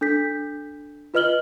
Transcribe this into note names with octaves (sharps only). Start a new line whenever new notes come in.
D4 A4 G6 B6
F4 B4 D#5 F6 F#7 G7